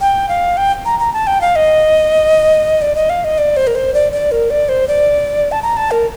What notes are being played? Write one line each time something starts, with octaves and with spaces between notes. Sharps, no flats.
G5
F5
G5
A#5
A#5
A5
G5
F5
D#5
D5
D#5
F5
D#5
D5
C5
A#4
C5
D5
D5
A#4
D5
C5
D5
A5
A#5
A5
A#4